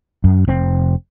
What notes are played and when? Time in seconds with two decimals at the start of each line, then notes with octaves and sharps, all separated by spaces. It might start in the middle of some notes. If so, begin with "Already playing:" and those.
0.24 F#2
0.48 F1 C4